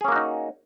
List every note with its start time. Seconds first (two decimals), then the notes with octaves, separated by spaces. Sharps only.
0.01 G#4
0.05 C#4
0.08 A#3
0.12 F#4
0.16 D#4